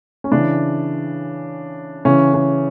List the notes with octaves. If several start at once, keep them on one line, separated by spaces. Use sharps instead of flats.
C#4
C#3 E3 D4
C#3 E3 C#4
C#4